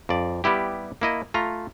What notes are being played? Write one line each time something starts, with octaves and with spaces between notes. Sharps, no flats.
F2 D5
G3 B3 E4 G4
A#3 E4 D#5
A3 F4 A#5